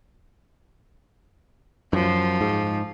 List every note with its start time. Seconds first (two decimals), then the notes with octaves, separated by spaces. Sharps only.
1.93 F#2 F3
2.41 G#2